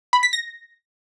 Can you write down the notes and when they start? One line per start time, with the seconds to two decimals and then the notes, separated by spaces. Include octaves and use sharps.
0.13 B5
0.23 B6
0.33 A#6